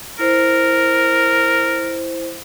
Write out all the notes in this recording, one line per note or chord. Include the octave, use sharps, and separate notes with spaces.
E4 A#4 C5